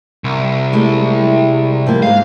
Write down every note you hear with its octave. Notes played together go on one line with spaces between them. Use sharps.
C2
G#3 A3 E4
F3 G3 A#3
G#2 G#3 F5